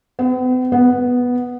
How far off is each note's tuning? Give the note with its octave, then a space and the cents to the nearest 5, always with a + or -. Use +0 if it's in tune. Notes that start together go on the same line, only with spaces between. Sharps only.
B3 +45
B3 -5